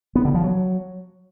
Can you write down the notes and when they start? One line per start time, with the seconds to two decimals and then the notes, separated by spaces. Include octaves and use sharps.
0.15 B3
0.25 D3
0.34 F3
0.44 F#3